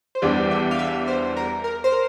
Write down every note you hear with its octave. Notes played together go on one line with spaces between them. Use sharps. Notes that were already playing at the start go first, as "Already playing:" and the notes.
C5
E2 E3 G3 D4 G4 D5
E5
F5
E5
C5
A#4
A#4
C5
A#4